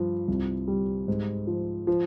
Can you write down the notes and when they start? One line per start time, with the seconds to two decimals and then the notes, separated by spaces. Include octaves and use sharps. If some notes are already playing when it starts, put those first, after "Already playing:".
Already playing: G2 F3
0.28 C2
0.68 G3
1.08 G#2
1.47 F3
1.87 F3